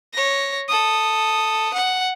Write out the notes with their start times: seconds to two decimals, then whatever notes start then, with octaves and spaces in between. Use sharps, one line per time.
0.13 C#5 A#6
0.68 A4 D#6
1.74 F#5